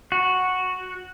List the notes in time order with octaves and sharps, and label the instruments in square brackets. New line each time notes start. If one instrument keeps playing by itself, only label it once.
[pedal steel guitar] F#4